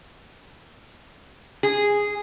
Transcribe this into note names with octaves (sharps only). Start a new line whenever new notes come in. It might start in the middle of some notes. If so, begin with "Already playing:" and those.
G#4